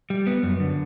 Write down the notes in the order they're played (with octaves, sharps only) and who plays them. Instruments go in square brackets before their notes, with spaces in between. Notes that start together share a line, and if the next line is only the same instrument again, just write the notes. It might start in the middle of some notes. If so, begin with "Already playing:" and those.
[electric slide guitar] G3
B3
F#2
D3